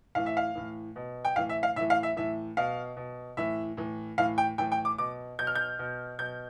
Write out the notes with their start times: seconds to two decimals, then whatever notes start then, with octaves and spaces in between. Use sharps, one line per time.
0.15 A2 E3 F5
0.26 E5
0.37 F5
0.55 A2 E3
0.96 B2
1.25 G5
1.36 A2 E3 F5
1.49 E5
1.63 F5
1.76 A2 E5
1.81 E3
1.90 F5
2.03 E5
2.17 A2 E3 E5
2.57 B2 F5
2.97 B2
3.37 A2 E3 E5
3.77 A2 E3
4.18 A2 E3 F5
4.38 G5
4.58 A2 E3 G5
4.72 G5
4.85 D6
4.98 B2 D6
5.39 B2 G6
5.47 F6
5.55 G6
5.79 B2
6.19 B2 G6